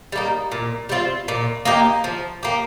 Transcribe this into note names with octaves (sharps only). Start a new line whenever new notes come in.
G3 A#3 D#4
A#2
G3 C4 F4
A#2
A#3 D#4 G4
F3
A#3 G4